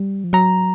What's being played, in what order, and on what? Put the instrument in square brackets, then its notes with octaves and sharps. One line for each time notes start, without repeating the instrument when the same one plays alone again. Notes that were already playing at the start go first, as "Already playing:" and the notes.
Already playing: [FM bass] G3
F3
[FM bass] F#3 [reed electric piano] A#5